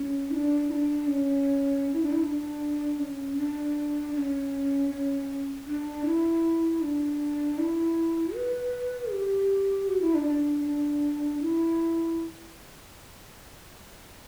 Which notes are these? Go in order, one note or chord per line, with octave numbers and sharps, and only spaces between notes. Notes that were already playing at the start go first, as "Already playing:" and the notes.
Already playing: C#4
E4
D4
E4
D4
C#4
E4
D4
E4
D4
C#4
D4
D4
C#4
C#4
D4
E4
D4
E4
B4
G4
F#4
E4
D4
D4
D4
E4